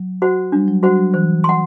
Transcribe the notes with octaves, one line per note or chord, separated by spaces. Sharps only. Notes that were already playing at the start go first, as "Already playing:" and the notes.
Already playing: F#3
F#4 C5 F#5
G3 D4
F#3
G3 F#4 C5 F#5
F#3
E3 C5
F#5 C6